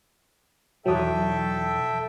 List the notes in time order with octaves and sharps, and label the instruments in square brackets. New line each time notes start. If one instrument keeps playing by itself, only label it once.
[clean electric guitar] B1 E2 [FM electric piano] F#3 D#6 [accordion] A4 E5 G5